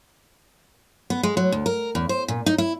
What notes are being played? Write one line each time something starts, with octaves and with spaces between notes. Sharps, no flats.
B3
G#3
F#3
D2
A#4
E2
C5
A#2
D#4
E4